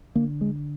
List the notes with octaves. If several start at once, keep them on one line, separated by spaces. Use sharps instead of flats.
D3 A#3
G#3